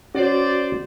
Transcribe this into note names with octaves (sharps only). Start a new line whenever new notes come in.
C#4 F#4 C5 D5